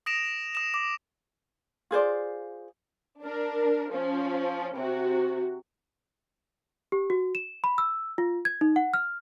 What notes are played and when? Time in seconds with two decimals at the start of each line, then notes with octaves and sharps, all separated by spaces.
0.06 D#6 A#6 D7 E7 F7
0.55 D#6 E7
0.74 D6
1.91 F4 G#4 C5 D5
3.22 D4 A#4
3.91 F3 C#4
4.76 C3 F#4
6.92 G4
7.10 F#4
7.35 E7
7.64 B5
7.78 E6
8.18 F4
8.45 G#6
8.61 D#4
8.76 F#5
8.94 F6